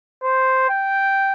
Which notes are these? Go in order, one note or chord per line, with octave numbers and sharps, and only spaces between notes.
C5
G5